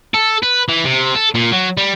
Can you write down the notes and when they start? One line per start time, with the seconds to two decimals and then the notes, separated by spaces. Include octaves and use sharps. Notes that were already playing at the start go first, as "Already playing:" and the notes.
0.14 A4
0.43 B4
0.69 E3
0.85 C3
1.15 A4
1.35 A#2
1.52 F#3
1.78 G3